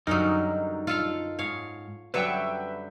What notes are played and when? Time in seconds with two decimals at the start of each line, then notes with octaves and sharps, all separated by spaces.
0.07 F#2 D3 F#3 G3 C#4 D#4 A#4
0.87 F4 A4 F5
1.39 G#2 C#5 F5
2.14 F#2 D3 F#3 G3 B4 C#5 E5 G5